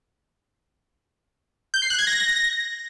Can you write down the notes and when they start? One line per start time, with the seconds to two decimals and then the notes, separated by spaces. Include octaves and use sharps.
1.74 G6
1.82 C7
1.90 F#6
1.99 G#6
2.07 A#6